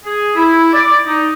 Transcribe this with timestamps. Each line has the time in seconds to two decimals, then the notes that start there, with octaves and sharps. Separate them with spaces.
0.04 G#4
0.36 E4
0.73 D5
1.06 D#4